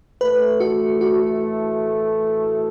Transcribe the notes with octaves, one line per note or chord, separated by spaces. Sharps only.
A2 E3 A3 B4
F#4
F#4